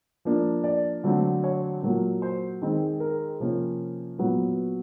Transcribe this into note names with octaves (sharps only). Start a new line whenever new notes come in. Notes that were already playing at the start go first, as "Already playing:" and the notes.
F3 A#3 D4
D5
D3 F#3 A3 C4
C#5
A#2 F#3 A#3
C5
D#3 G#3 C4
A#4
C3 F3 A#3 C#4
A#2 F#3 B3 B4